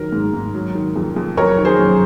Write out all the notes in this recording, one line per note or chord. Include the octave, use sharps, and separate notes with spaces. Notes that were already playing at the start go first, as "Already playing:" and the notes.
Already playing: D#3 F#3 A#4
G#2
G#2
F#3
D#3
F2
F2
F#3 A#4 C#5
D#3
G#4 C5
F#2